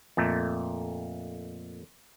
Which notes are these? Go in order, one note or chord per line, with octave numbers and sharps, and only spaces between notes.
F2 A#2 A3